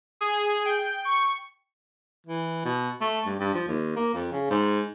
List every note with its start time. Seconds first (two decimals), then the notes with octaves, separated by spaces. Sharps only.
0.21 G#4
0.65 G5
1.05 C#6
2.26 E3
2.65 B2
3.01 A3
3.26 G2
3.39 G2
3.54 F3
3.68 D#2
3.96 A#3
4.14 F2
4.32 C#3
4.50 G#2